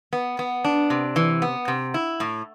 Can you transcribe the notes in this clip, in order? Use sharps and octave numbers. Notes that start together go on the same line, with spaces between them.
B3
B3
D4
C3
E3
B3
C3
E4
A2